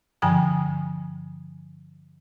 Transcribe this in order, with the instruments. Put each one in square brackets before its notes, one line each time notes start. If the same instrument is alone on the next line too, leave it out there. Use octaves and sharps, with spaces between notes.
[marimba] G2 D3 F3 G5 G#5 D#6